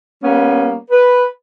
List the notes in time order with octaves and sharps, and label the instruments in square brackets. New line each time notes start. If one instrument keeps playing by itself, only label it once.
[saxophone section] G3 A#3 B3 C#4
B4